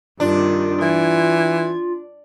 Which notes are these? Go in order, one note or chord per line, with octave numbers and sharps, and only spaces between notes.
G2 C3 D#3 D4 F4
E3 G#6